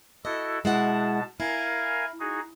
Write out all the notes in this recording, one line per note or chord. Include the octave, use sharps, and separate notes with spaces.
E4 F#4 A4 D#5
B2 G#3 E4 F#5 A5
E4 A#4 F5 G#5
D#4 F#4 G#4